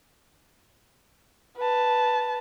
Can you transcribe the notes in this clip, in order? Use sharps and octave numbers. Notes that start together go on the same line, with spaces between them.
B4 A5